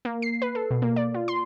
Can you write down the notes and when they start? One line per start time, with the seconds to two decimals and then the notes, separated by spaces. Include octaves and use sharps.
0.05 A#3
0.22 C7
0.42 B4
0.55 A4
0.71 B2
0.82 A#3
0.96 D5
1.14 F4
1.28 C6